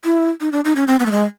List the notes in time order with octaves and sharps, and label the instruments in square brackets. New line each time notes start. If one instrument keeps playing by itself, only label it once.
[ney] E4
D#4
D4
D#4
C#4
C4
B3
A3
G#3